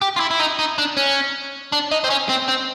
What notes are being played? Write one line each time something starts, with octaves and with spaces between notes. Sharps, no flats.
G4
F4
E4
E4
D#4
D#4
D4
C#4
D4
D#4
C4
C#4
C4
C4